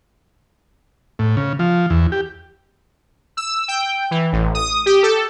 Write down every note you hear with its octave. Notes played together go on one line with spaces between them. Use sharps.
A2
C#3
F3
E2
G4
E6
G5
E3
A1
D#6
G4
A4